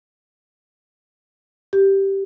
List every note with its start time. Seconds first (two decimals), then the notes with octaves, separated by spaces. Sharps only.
1.73 G4